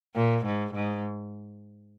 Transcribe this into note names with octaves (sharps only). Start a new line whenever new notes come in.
A#2
G#2
G#2